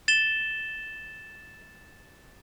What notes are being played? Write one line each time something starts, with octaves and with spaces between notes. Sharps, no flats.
A6 E7 G7